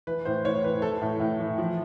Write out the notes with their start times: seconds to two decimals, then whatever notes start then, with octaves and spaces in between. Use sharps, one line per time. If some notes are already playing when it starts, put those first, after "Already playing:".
0.07 E3 B4
0.25 A2 C5
0.45 A2 C#5
0.63 E3 B4
0.82 E3 A4
1.01 A2
1.20 A2
1.40 E3
1.58 F3